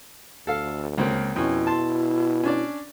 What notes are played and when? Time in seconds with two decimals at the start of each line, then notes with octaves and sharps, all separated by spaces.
0.47 D2 A4 F5
0.98 C#2 A#3 C4
1.36 F2 B2 C#4 E4
1.67 A5 C6
2.43 C#4 D4 D5